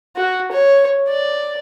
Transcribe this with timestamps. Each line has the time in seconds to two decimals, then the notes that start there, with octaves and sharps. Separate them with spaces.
0.16 F#4
0.52 C#5
1.08 D5